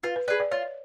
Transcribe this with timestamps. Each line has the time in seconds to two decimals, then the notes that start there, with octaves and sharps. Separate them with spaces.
0.03 F4 B4
0.16 B4
0.28 G#4 B4 D5
0.40 D5
0.51 F4 C#5